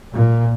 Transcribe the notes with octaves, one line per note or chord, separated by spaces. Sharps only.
A#2